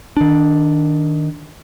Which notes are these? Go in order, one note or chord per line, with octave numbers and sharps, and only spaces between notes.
D#3 D4